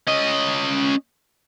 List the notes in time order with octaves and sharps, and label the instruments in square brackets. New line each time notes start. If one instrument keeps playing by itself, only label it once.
[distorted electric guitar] C#4 D#5